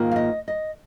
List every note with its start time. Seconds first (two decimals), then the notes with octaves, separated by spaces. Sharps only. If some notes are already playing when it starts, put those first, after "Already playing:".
Already playing: G#2 D#3 A#3 F4
0.12 F5
0.16 D#5
0.48 D#5